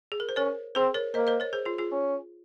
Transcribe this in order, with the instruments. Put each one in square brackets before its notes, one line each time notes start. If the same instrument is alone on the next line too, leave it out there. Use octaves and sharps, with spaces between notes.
[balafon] G#4
A#4
C5
[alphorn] C#4 [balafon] A#4 C#5
[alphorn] C4 [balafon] G#4 C5
[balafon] A#4 C#5
[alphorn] A#3 [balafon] C5 D#5
[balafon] C5 D#5
A#4 C#5
G#4 C5
F4 G#4
F4 G#4
[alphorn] C#4